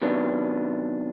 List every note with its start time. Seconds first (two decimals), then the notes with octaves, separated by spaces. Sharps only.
0.02 C3 D#3 F#3 B3 D4